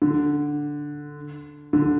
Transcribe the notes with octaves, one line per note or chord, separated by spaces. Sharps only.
D3
D3